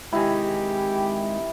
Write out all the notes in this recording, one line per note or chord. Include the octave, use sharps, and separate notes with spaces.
C3 D#3 G#3 E4 G4 G#5